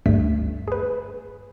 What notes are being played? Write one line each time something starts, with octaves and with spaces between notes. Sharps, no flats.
G1 D2 G2 G3 A3 B6
G#4 B4